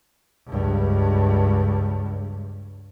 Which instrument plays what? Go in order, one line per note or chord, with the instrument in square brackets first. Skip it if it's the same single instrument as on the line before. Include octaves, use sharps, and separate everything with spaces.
[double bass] C#2 G2